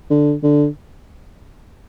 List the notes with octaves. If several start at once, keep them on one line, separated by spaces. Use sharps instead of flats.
D3
D3